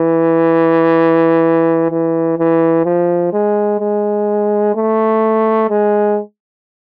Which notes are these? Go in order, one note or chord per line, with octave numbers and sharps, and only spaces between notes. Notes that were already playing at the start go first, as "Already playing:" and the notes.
Already playing: E3
E3
E3
F3
G#3
G#3
A3
G#3